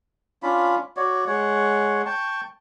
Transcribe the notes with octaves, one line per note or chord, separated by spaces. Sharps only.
C#4 D4 F4 B5
F#4 C#5 D5
G#3 C#5 F#5
G5 A5 C#6